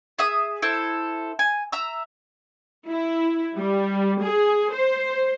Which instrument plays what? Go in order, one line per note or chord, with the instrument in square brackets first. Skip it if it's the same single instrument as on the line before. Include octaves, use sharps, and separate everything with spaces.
[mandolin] G#4 E5 D#6
E4 A4 C5
G#5
E5 A#5 E6
[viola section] E4
G3
G#4
C5